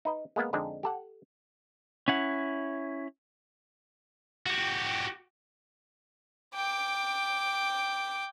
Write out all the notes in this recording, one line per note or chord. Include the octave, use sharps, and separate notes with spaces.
D#4 B4 D#5
G#3 A#3 B3 F5
F2 D3 G#3 C4 D4 D#4
G4 A4 F#5
C#4 E4 F#5
F#4 G4
G5 D6